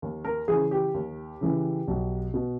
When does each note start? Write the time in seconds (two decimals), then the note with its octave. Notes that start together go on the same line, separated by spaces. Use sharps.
0.02 D#2
0.25 A#4
0.48 C#3 E3 G#4
0.71 G4
0.94 D#2
1.41 C#3 E3
1.88 B1
2.34 B2